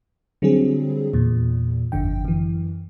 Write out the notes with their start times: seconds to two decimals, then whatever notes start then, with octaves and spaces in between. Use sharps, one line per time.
0.42 D3 F#3 G3 C4 G#4
1.14 E2 A#2
1.92 G1 F2 D3 G5
2.25 F#2 E3